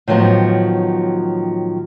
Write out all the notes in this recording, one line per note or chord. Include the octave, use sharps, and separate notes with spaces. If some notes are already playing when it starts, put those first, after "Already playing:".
A2 D#3 F3 F#3 B3